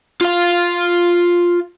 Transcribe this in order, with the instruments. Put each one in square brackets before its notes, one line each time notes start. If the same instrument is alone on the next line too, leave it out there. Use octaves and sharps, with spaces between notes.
[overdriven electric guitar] F4 F5